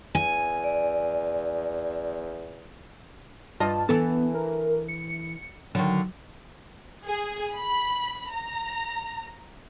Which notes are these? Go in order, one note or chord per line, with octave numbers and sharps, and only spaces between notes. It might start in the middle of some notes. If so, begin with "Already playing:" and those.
E2 G#5
D5
G2 F4 D#5 A5
E3 B3 A4
A#4
C#7
D3 D#3 F#3
G#4
B5
A#5